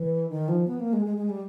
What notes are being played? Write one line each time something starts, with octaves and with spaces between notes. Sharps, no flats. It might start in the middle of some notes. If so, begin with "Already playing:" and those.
Already playing: E3
D#3
F3
B3
A#3
G#3
G#3
G#3
G3